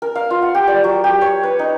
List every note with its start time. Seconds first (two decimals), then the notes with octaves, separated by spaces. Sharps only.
0.02 A#4
0.15 F5
0.30 F4
0.42 F#5
0.55 G4
0.68 D5
0.84 F#3
1.04 G4
1.21 C#5
1.43 B4
1.59 D#4